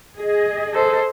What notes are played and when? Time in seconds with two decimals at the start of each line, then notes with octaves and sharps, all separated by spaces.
0.17 G#4 D#5
0.73 A4 C5